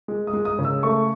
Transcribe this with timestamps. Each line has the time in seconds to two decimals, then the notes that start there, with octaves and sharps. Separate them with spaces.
0.08 G#3
0.27 D#6
0.33 G#3
0.45 D#6
0.59 C#3
0.65 E6
0.83 A3 C#6